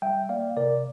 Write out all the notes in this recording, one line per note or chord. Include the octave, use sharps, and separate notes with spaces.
G3 E5 G5
A#3 D5 F5
C3 A#4 D5